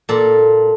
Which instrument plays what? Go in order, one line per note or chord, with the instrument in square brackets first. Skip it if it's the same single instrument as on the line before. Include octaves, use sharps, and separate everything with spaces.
[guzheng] A#2 A4